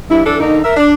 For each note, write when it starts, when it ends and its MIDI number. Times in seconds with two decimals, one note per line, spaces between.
0.10 0.22 43
0.10 0.22 64
0.24 0.37 52
0.24 0.37 62
0.24 0.37 69
0.39 0.59 50
0.39 0.59 58
0.39 0.59 63
0.63 0.73 70
0.63 0.73 76
0.77 0.94 62